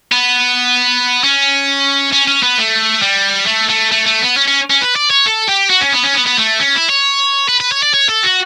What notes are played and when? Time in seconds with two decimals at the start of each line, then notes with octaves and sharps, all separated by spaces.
0.12 B3
1.23 C#4
2.13 C#4
2.28 C#4
2.43 B3
2.58 A3
3.02 G3
3.47 A3
3.69 A3
3.92 A3
4.06 A3
4.22 B3
4.37 C#4
4.47 C#4
4.70 C#4
4.81 B4
4.96 D5
5.10 C#5
5.26 A4
5.48 G4
5.70 F#4
5.81 C#4
5.93 B3
6.04 C#4
6.15 B3
6.27 B3
6.38 A3
6.60 C#4
6.75 E4
6.89 C#5
7.49 B4
7.60 B4
7.72 C#5
7.83 D5
7.94 C#5
8.09 A4
8.23 F#4